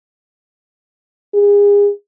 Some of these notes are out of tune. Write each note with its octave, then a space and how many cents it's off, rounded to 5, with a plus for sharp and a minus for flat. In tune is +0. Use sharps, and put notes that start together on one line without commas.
G#4 -35